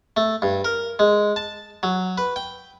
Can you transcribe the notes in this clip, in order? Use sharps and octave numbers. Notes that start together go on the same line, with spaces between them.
A3
G2
A#4
G#3
A5
F#3
B4
G5